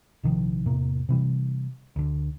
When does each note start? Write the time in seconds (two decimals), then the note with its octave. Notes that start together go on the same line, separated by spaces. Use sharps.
0.23 A#1 C3 D#3 F3
0.66 E2 A2 C3 A#3
1.09 C3 E3 G3
1.96 D2 D3